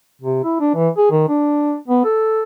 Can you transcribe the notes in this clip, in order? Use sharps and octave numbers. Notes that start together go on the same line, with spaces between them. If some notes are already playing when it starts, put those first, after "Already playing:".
C3
E4
D4
E3
G#4
D#3
D4
B3
A4